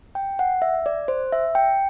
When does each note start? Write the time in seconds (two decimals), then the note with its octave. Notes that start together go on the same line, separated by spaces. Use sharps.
0.15 G5
0.39 F#5
0.62 E5
0.86 D5
1.08 C5
1.32 E5
1.55 G5